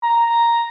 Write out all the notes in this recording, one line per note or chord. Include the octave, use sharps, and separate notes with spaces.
A#5